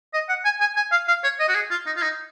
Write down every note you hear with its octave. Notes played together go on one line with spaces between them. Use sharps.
D#5
F#5
G#5
G#5
G#5
F5
F5
C#5
D#5
F#4
G#4
F4
D#4
F4
D#4